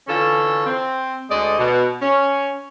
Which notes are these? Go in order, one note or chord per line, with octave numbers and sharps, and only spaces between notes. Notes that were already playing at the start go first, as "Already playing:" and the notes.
D3 E3 C#4 F4 A4
C4
D2 D3 G#3 D4 D5 D#5
B2
C#4